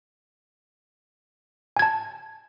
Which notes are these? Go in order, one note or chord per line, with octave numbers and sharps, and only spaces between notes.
G#5 A5 G#6